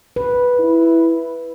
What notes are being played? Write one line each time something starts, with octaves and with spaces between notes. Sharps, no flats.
B4
E4